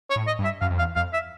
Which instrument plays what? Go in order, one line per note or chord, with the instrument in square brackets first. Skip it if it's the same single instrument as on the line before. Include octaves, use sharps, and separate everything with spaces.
[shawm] C#5
[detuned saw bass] A2
[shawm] D#5
[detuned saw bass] G2
[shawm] E5
[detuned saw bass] F#2 [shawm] F5
[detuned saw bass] F2
[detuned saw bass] E2 [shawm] F5
[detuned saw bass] F2 [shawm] F5
[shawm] E5